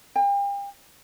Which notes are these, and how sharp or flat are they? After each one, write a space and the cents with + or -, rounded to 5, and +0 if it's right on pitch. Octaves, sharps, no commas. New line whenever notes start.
G5 +40